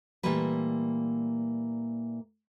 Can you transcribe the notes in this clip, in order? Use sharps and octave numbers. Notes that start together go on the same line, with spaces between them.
A#2 E3 G3 A3 A#3 B4